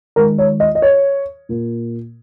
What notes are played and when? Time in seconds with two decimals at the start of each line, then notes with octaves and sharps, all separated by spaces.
0.16 D#3 G#3 A#4
0.38 C#5
0.60 D#5
0.75 D#5
0.82 C#5
1.49 A#2 A#3